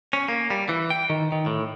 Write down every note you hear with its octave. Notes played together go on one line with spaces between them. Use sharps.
C#4
A#3
G3
E3
G5
D#3
D#3
A2